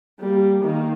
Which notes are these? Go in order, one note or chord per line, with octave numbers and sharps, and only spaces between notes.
G3 A#3
D#3 A#3